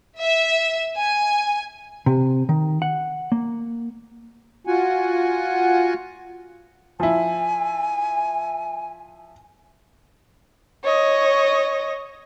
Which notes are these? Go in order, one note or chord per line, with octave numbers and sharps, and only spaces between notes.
E5
G#5
C3
D#3
F#5
A#3
F4 F#4 F#5 G#5
F3 E4 G#5
C#5 D#5